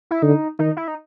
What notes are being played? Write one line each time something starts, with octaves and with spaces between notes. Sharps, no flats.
E4
D3 D#4
D#3 D#4
E4
D#4